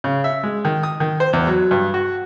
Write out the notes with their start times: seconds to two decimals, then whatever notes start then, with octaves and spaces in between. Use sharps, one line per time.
0.04 C#3
0.24 E5
0.43 G#3
0.65 D#3
0.83 D#6
1.00 D#3
1.20 C5
1.33 E2
1.47 F#3
1.71 G2
1.94 F#4